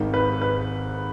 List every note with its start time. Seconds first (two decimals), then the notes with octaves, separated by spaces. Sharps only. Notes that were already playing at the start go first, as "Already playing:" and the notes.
Already playing: G#1 G#2 D#3
0.14 B4
0.41 B4